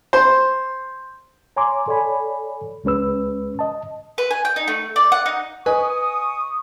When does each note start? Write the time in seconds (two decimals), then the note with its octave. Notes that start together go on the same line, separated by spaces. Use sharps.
0.13 C5
1.56 C#5 G#5 A#5 C6 D6
1.88 A4 C#5 D5 G#5 B5
2.84 C#2 G#3 C#4 B4 E6
3.59 D#5 A5
4.18 B4
4.31 G#5
4.45 G5
4.56 D#4
4.68 A3
4.96 D5
5.12 F#5
5.26 D#4
5.66 B4 D#5 G#5 C#6 D#6